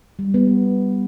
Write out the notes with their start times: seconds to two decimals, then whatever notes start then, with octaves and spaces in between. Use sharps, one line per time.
0.19 G3
0.34 B3